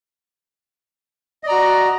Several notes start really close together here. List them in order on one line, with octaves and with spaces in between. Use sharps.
D#5 D5 A#5 F#4